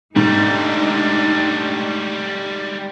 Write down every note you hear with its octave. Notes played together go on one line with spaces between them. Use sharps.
G#2 G3 A3 D4 D#4 G4